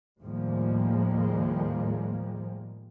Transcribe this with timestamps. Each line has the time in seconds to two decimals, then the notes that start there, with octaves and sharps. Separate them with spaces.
0.21 D#2 A2 F3 G3 G#3 A#3